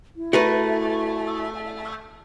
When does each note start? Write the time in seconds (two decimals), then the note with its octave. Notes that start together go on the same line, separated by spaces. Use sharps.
0.16 E4
0.33 A3 F#4 A#4 B4